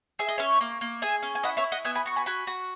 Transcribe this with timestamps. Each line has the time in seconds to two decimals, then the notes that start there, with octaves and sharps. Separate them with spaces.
0.19 G#4 E5
0.28 D#5
0.38 C#4 C#5 E5
0.61 A#3
0.81 A#3
1.02 G#4 E5 G#5
1.23 C#4
1.35 G#5
1.43 E4 D#5 F#5
1.57 C#5 E5
1.64 E4
1.72 D#5 F#5
1.85 B3 E5 G#5
1.95 G#5 B5
2.06 F#4 C#6
2.16 G#5 B5
2.26 F#4 G#5 B5
2.47 F#4